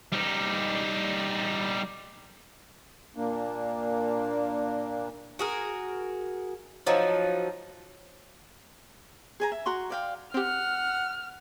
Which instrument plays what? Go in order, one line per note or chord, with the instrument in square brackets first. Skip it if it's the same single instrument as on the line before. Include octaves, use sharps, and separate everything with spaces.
[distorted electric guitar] G3 D#4
[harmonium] A#2 A#3 D4
[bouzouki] F#4 G#4 A#4
F3 F#3 D#4
[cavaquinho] G#4 G#5 A#5
E5
F#4 A#5 C6 C#6
D5 F5 G5
[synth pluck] C4 G4 [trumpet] F#5 [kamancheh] F6